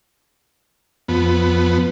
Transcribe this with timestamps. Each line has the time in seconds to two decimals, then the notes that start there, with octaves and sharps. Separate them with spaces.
1.08 F2 B3